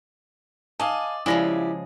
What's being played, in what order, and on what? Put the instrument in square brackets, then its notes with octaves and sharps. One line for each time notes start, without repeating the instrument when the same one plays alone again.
[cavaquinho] D5 D#5 [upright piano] F5 G#5 A5
[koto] C#3 F3 G#3 [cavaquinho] E4 G4 [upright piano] D5 A#6